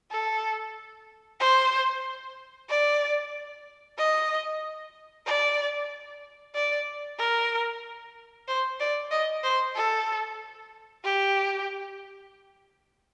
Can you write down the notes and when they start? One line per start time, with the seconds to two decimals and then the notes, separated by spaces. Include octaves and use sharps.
0.11 A4
1.40 C5
2.69 D5
3.98 D#5
5.26 D5
6.55 D5
7.19 A#4
8.48 C5
8.80 D5
9.11 D#5
9.44 C5
9.76 A4
11.04 G4